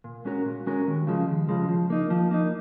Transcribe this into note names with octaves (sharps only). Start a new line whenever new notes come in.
A#2
G#3 C#4 F#4 A#4
A#2
G#3 C#4 F#4 A#4
D#2
C#3 F3 G#3
D#2
C#3 F3 G#3
F3
A#3 D#4
F3
A#3 D#4